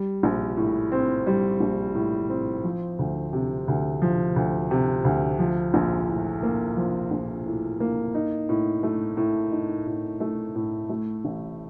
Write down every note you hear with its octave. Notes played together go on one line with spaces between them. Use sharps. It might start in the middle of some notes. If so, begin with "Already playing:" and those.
Already playing: G3
A#1
A2
C4
G3
A#1
A2
C4
F3
D2
C3
D2
F3
D2
C3
D2
F3
A#1
A2
A#3
F3
A#1
A2
A#3
D#4
A2
A3
A2
D#4
A2
A3
A2
A3
A1